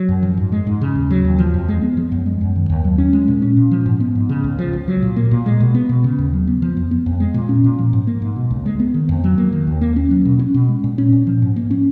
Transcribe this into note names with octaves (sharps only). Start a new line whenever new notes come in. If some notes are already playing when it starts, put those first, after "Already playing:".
Already playing: F#3
F#2
F3
G#2
G#3
G#2
C#3
D#2
F#3
D#2
F3
F2
G#3
B3
F3
F#2
G#3
F#2
D#3
D#2
F#3
C#4
G#3
A#2
C#4
A#2
F3
G#2
B3
G#2
C#3
C#2
F3
C#2
F#3
A#2
A#3
A#2
G#3
B2
B3
B2
C#3
D#2
F#3
B3
F3
F2
B3
F2
G#3
A#2
C#4
A#2
F3
G#2
A#3
G#2
B2
C#2
G#3
B3
D#3
F2
F#3
A#3
D#3
D#2
A#3
C#4
F#3
B2
C#4
B2
G#3
A#2
C#4
A#2
F3
G#2
A#3
C#4